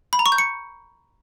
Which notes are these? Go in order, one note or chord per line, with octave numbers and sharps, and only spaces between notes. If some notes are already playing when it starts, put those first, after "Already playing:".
B5
A#5
C#6
G6
C#7